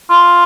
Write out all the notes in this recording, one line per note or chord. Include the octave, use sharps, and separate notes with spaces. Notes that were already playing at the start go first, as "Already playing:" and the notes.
F4